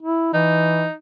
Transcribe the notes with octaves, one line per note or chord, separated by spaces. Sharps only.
E4
E3 D#4